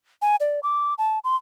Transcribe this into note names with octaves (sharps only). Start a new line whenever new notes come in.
G#5
D5
D6
A5
C6